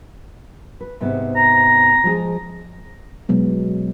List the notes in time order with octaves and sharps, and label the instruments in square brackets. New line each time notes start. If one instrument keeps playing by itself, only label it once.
[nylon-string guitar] B4
G#2 C3 B3
[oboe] A#5
[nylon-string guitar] F3 G#3 G#4
[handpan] B2 F#3 G#3 B3